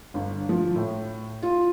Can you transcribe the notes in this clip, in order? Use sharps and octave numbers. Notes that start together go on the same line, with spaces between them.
G1
F3
A2
F4